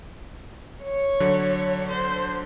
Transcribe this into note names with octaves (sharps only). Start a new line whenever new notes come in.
C#5
D3 F#3
C5